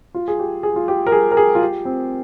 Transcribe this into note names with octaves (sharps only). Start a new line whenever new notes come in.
F4
G#4
G4
G#4
F4
G4
A#4
G#4
A#4
G#4
F4
G4
C4